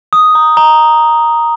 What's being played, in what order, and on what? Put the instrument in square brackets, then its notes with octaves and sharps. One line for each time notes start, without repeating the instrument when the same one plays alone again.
[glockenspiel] D#6
A#5
A#5